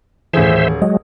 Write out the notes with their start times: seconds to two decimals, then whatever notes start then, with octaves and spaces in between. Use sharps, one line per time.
0.33 D#1 A2 E3 G#4 C5 E5
0.82 F#3 G#3 D#5